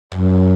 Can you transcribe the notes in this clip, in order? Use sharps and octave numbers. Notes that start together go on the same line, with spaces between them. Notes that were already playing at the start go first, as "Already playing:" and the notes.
F#2